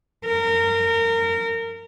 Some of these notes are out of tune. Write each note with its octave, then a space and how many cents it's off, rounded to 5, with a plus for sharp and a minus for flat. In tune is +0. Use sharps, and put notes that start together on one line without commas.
A#4 -25